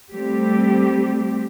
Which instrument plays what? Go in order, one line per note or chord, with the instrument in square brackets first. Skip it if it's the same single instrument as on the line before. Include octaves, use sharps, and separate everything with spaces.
[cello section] G3 A3 C4 G4